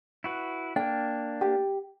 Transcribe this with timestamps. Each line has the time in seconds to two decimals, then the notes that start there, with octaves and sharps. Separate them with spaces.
0.24 E4 F#4 B4
0.76 A#3 D4 G5
1.41 G4